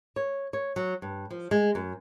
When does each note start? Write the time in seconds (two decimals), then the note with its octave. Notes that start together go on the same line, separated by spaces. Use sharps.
0.16 C#5
0.53 C#5
0.76 F#3
1.02 G2
1.30 F3
1.51 G#3
1.75 F#2